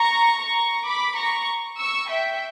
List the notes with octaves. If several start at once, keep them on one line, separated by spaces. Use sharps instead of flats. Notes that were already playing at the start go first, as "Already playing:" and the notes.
Already playing: A#5 C#6
A#5 C#6
B5 D6
A#5 C#6
C#6 E6
E5 G5